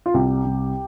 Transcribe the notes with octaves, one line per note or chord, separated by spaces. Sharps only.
F4
C2 G4
C2